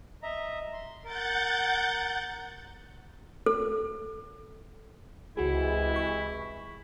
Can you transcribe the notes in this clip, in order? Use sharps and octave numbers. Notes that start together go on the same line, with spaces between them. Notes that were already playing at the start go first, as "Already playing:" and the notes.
D#5 E5 A#5
C6
A#4 F#5 G6 A6
A4
C#2 C3 E3 G#3 E4 F#4 G#4
C#6 B6